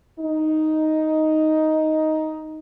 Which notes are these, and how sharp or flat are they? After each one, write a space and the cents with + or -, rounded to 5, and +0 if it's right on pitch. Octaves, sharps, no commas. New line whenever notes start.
D#4 +5